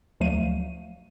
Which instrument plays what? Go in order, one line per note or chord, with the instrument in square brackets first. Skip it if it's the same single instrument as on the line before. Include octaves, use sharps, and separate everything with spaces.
[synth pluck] D2 F3 F#3 A3 F5 D#7